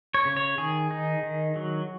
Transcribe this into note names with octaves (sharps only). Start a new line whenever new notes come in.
C#5
C#3
C#5
D#3 G#4
D#4
D#3
F#3